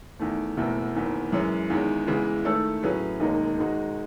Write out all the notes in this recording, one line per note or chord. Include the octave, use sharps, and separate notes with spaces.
E2 D#3 A3
F#1 E2 B2 A3 E4
F#1 E2 D#3
F#2 E3 G#3 C#4
E2 D#3 G#3
E2 C#3 E3 G#3
D#3 A3 E4 A4 C#5
A2 F#3 C#4 G#4 B4
E1 D#2 D#3 G#3 D#4
G#2 D#3 G#3 D#4 F#4